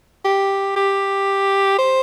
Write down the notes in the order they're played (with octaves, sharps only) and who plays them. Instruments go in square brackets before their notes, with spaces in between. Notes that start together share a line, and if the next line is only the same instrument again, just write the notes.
[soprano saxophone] G4
G4
C5